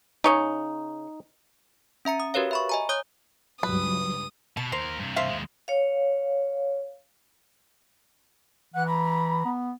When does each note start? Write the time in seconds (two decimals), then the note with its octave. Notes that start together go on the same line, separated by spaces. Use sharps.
0.24 C#3 D#4 C#5 D#5
2.05 C#4 E5 A#5 C#7
2.20 D#6
2.34 F#4 G4 A#4 B4 C#5 F5
2.51 E5 B5 C#6
2.69 D#5 G#5 A#5
2.89 C#5 D#6 G6
3.63 C#2 G2 F#3 B4 D#6
4.57 B2 A5
4.72 D#2 A#4 C5
4.99 G2 C3
5.16 C5 E5 F5
5.29 D#2 G#3
5.68 C#5 F5
8.74 E3 F#5 F#6
8.86 A#5 B5
9.45 B3